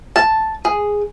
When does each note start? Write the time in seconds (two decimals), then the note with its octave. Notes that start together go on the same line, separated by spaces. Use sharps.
0.16 A5
0.65 G#4